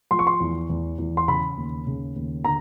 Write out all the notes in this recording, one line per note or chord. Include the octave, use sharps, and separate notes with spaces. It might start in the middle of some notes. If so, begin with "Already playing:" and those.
F3 C6
C#6
C6
E2
E2
E2
C6
C#3 B5
D#2
C#3
D#2
D3 A#5